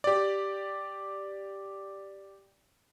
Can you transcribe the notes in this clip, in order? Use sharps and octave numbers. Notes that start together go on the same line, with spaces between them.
G4 D5